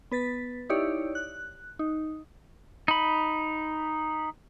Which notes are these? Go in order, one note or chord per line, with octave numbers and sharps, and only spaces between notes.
B3 B4 A6 B6
D#4 E4 G4 C#5 D5
F#6
D#4
D#4 B5